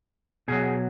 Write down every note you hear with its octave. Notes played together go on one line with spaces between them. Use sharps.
B2 F#3 G#4